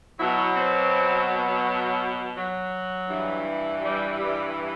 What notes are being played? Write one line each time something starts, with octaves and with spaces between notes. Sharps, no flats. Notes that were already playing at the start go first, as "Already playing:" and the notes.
B2 F#3 E4
C4
F#3
G2 E3
G3
G3